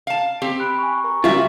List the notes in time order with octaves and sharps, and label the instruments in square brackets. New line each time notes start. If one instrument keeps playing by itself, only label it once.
[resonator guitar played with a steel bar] F5 A5
C4 G4
[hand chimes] B5 F#6 D7
G#5 C#6
A#4 A#5 C#6
[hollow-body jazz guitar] C#2 G3 F4 [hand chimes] C#4 F5 [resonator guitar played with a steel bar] F#4 E5